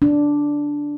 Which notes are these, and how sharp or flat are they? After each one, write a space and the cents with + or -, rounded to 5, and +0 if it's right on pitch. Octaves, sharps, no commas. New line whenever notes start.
D4 -5